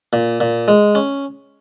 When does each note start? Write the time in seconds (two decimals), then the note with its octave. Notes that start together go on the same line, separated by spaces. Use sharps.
0.13 A#2
0.40 A#2
0.68 G#3
0.95 C#4